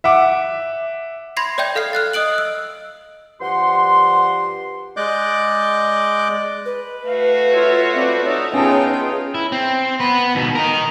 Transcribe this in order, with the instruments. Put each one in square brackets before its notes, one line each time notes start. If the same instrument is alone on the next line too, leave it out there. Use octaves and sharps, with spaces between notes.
[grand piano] E5 F#5 D6
[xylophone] B5 C6 G#6 A#6 C7
C#5 D5 E5 G5 G6 G#6
A4 F5 F6 C7
F6 F#6 A6
D#5 D#6 F#6 D7 F#7
E6
[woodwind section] G2 F3 G4 F#5 C6
[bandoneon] G#3 D5 D#5 D6 F#6 G6
[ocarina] B4
[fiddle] A3 F#4 [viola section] F5
[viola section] F4 C#5 E5
C4 B4 D5
[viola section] D#4 E5 A5 [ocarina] C#5
[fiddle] B3 G5 [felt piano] C#4 A5 [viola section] D#4 F4 G#4
[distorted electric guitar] E4
C4
B3 B4
D#2 B2
A#4 D#5